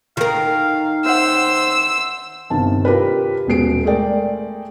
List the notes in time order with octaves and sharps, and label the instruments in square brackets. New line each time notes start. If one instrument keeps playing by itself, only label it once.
[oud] D#3 A#4 [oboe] F5
[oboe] C5 [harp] E5 F#5 [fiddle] E6
[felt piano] G1 C3 D#3 A5
F4 G4 A#4 B4
D#1 B2 G#3 C7 D7
G#3 A3 A#4 D5 G5